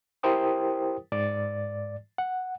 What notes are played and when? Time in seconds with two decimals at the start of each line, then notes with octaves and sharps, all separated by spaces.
0.23 E4 G4 A#4 C5 G5 D#6
1.12 G#2 D5 A6
2.18 F#5